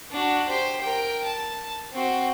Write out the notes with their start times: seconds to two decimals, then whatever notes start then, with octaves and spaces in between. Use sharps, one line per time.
0.11 D4 F#4
0.48 G4 C5
0.82 A#4 G5
1.25 A5
1.92 C4 F#4